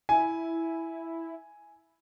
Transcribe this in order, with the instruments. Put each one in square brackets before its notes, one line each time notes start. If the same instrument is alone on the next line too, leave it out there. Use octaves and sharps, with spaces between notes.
[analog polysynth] E4 [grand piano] G#5